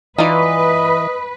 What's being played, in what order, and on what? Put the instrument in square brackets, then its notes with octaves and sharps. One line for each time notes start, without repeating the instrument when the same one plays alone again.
[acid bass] E3 [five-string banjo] D#4 F4 D5 [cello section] B4 [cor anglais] D#5